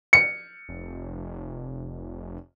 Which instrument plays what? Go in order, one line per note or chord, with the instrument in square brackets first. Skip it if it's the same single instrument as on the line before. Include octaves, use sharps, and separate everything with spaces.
[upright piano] C#7
[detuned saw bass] F1